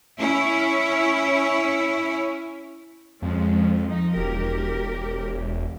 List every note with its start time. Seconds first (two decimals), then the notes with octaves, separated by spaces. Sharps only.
0.19 C#4 E4 C#5
3.22 F2 F3 G#3 C#4
3.84 F3 D#4
4.16 E1 G4 A#4